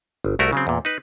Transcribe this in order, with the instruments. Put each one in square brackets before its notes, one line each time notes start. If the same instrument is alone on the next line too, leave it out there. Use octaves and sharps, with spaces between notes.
[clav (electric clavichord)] G1
C2 A3 E4 F#4 A#4
C#3 F#3 C4
E2 A#2
D#4 B4